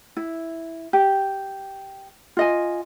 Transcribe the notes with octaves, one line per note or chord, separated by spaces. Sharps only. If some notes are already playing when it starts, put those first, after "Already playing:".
E4
G4
F4 D#5 G#5